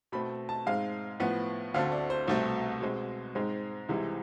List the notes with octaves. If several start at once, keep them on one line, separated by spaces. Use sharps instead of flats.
B2 A3 C4 B5
A5
G#2 G#3 C4 F5
A2 F3 B3
D2 D3 A3 C4 F5
D5
C5
C2 B2 A3 C4 C5
B2 G#3 C4
G#2 G#3 C4
C2 C3 E3 G#3